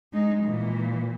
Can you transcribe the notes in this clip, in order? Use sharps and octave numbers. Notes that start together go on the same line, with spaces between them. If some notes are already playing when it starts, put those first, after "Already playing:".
G#3 D#4
A#2 E3